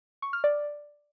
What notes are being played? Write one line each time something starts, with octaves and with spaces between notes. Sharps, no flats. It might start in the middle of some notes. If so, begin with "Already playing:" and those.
C#6
F6
D5